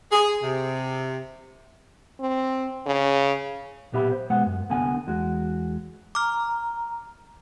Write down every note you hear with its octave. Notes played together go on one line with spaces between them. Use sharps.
G#4
C3
C4
C#3
B1 A#2 B3 G4 E5 B5
C5
B2 G#3 B3 F#5
F#2
C2 D3 B3 F#5 G#5
E2 G#3 F#4
A#5 D6 F6